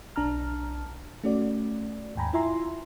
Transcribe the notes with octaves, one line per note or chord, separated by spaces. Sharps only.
B1 D4 A5 A#5 F6
A3 C#4 F#4 D5
D#2 G#2 G5 G#5 A#5 B5
E4 F4 E5 G#5 A#5 C6